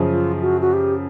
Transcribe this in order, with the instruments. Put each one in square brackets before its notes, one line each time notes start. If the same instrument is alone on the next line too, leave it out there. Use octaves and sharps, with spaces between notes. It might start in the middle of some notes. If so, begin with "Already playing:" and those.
Already playing: [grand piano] F#2 C#3 F3
[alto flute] F4
F#4
F#4
G4